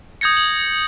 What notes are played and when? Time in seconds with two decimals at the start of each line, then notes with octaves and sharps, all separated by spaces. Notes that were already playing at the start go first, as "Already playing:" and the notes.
0.21 D#6 G6 G#6 A#6 C#7
0.37 F#7